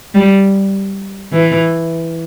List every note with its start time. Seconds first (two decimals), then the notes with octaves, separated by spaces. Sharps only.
0.15 G3
1.32 E3